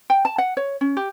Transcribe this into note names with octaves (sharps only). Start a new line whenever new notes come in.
G5
A5
F#5
C#5
C#4
G4